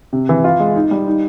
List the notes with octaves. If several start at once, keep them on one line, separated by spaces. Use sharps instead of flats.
C3
E3
F4
G#3
D#4
G3
D#4